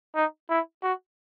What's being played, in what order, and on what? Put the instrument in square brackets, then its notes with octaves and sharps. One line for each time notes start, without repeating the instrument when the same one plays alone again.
[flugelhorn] D#4
E4
F#4